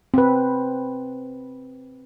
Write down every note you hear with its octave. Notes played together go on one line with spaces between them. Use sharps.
C4 B4